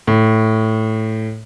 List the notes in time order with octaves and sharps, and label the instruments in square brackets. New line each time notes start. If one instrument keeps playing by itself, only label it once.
[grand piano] A2